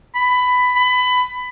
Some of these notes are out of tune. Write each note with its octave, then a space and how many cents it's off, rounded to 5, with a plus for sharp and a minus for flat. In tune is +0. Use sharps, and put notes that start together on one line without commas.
B5 +15
B5 +20